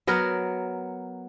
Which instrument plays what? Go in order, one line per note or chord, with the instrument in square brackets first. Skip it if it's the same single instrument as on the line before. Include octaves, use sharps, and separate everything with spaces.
[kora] F#3 B3 A#4